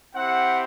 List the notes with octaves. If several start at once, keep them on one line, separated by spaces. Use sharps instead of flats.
C4 E4 G4 F#5